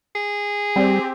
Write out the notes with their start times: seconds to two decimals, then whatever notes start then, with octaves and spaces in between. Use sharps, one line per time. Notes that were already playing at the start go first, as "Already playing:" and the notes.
0.15 G#4
0.76 G3 C4 G4